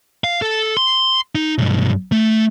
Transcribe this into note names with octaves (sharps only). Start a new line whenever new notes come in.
F5
A4
C6
D#4
B1 G2
A3